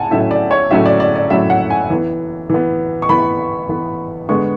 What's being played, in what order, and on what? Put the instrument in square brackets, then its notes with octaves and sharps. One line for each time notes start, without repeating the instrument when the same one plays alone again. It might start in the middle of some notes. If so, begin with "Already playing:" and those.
Already playing: [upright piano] A2 F#5 G#5 A5
A2 F#3 A3 C#4 E5
D5
C#5
A2 F#3 A3 C#4 E5
D5
D5
D5
A2 F#3 A3 C#4 E5
F#5
G#5
E3 B3
E3 B3
C#6
E3 B3 B5
E3 B3
D3 G#3 B3 C#6